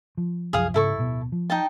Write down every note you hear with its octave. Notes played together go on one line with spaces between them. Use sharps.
F3
C2 F#2 F3 G#4 F5 D#6
G#2 C#3 E4 A4 C#6
D1 B2
F3
D#4 G5 A5